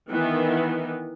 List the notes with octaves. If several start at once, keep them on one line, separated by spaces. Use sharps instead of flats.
D#3 E3 B3